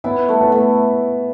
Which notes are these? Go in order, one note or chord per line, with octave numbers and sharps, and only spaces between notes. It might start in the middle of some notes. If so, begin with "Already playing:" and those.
B3 E4
A3
B3
A3